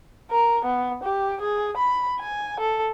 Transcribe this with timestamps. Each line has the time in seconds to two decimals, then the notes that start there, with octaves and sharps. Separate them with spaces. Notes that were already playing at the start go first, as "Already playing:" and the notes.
0.31 A#4
0.65 B3
1.04 G4
1.41 G#4
1.77 B5
2.20 G#5
2.60 A4